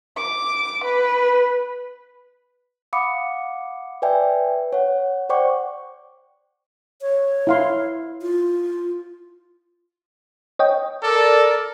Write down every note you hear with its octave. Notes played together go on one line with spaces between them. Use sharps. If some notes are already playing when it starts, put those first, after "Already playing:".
D6
B4
F5 F#5 B5 D6 D#6 C#7
B4 D5 E5 G5 G#5
C#5 F#5
C5 D5 F#5 G5 C#6 D6
C#5
E4 F5 C6
F4
C#5 D#5 G5
A4 A#4 D5